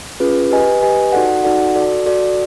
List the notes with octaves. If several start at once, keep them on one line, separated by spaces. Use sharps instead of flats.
C#4 F4 G#4 B4
G4 B4 D#5 G#5
G4 B4 D#5 G#5
D#4 F#4 A4 D5 F#5
D#4 F#4 A4 D5 F#5
F#4 A4 D5
F#4 A4 D5